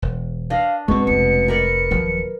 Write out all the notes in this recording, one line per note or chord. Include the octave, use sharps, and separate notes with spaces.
E1
D4 D#5 F5
G#2 B2 G#3 C4 C#6
F1 C#7
A#4 B4 D5
D#1 F3 F#3